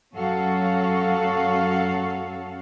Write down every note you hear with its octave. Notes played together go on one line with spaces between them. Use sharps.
F#2 F#3 C#4 F#4 A4 F5